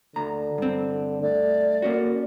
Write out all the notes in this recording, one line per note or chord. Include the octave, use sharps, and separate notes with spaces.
D2 D3 A#5
G2 C4
A3 D5
A#3 C#4 F#4